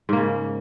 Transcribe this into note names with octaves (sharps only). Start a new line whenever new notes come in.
G#2 C#3 A#3